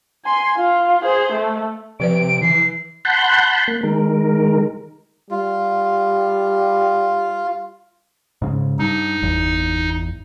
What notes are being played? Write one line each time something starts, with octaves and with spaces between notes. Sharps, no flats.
G#5 C6
F4
G#4 C5
A3
C3 F3 B4 D5 D7
E3 C7
F#5 A5 B5 C6 F#6 G6
A#3
D#3 G#3 A#4
G3 F4
G#2 C#3
G2 D#4
G1 E2